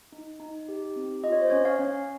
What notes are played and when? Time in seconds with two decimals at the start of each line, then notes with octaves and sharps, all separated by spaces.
0.12 D#4
0.40 D#4
0.69 G4
0.96 C4
1.24 F4 D#5
1.32 C#5
1.42 C5
1.50 C#4 C#5
1.65 C#5 F5
1.79 C#4